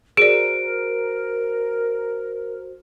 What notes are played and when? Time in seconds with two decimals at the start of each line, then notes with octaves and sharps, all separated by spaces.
0.17 F#4 G#4 A#4 C5 D5 D7